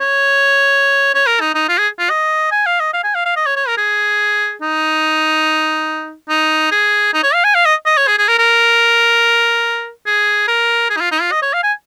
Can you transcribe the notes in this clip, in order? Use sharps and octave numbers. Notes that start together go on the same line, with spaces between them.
C#5
C#5
A#4
D#4
D#4
F4
G#4
F4
D#5
G#5
F5
D#5
F5
G#5
F5
F5
D#5
C#5
C#5
A#4
G#4
D#4
D#4
G#4
D#4
C#5
F5
G#5
F5
D#5
D#5
C#5
G#4
G#4
A#4
A#4
G#4
A#4
G#4
D#4
F4
D#4
F4
D#5
C#5
F5
G#5